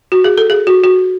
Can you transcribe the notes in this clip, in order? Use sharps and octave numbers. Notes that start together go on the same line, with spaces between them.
F#4
G#4
A4
G#4
F#4
F#4